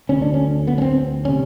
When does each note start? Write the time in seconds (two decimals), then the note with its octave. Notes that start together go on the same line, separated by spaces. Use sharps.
0.09 D2 D3 C#4
0.22 D4
0.34 C#4
0.67 B3
0.78 C#4
0.82 C4
1.25 C3 C#4